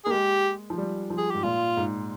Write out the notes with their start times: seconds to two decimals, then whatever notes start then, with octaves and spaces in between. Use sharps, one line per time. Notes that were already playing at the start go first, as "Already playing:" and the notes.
0.05 A#3 G#4
0.11 G#3 G4
0.70 F3
0.78 G3
1.10 F3
1.18 G#4
1.30 G#2 G4
1.43 A#2 F4
1.77 G#2